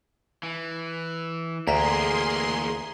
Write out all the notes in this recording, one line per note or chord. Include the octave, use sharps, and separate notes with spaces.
E3
D2 E3 A#3 G#4 A#5 C6 B6